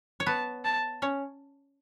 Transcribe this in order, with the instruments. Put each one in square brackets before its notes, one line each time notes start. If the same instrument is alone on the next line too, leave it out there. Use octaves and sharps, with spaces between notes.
[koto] C#5
[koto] B3 B4 [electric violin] A5
[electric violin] A5
[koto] C#4 C#5